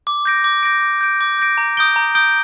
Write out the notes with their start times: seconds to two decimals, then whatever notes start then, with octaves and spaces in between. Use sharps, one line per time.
0.07 D6
0.25 G6 A#6 D7
0.44 D6
0.63 G6 A#6 D7
0.81 D6
1.01 G6 A#6 D7
1.21 D6
1.39 G6 A#6 D7
1.58 A#5
1.77 D#6 G6 D7 G7
1.96 A#5
2.15 D#6 G6 D7 G7